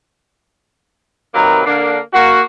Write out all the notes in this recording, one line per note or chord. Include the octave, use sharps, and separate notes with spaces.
C3 D#3 F#3 A#3 B4 A#5
D3 A#3 D4
A#3 F#4